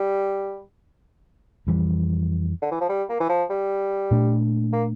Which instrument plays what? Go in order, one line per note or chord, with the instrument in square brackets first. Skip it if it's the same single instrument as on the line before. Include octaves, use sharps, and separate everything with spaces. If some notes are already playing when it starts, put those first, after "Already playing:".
Already playing: [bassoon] G3
[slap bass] F2 E3 G3
[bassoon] D3
E3
F3
G3
A#3
E3
F3
G3
[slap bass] A#2 A3 D4
[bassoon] A#3